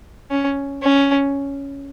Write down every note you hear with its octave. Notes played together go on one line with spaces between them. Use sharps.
C#4
C#4